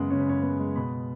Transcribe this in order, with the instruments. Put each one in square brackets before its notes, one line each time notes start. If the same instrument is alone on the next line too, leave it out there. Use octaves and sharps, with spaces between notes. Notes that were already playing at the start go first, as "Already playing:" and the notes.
Already playing: [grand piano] F#2 C#3 G#3 B3 F#5
C#3 C#5
B4
F#2 C#5
B3
G#3
B2 B5